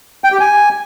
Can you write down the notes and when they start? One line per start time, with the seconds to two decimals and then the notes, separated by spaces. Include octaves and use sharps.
0.24 G5
0.32 G4
0.40 G#5